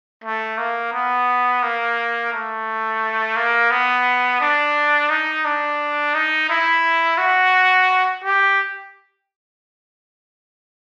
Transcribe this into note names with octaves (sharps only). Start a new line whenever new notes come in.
A3
A#3
B3
A#3
A3
A#3
B3
D4
D#4
D4
D#4
E4
F#4
G4